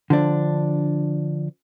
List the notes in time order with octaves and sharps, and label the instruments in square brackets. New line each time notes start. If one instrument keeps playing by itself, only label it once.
[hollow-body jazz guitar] D3 F3 D4